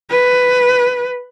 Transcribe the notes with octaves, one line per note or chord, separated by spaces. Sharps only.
B4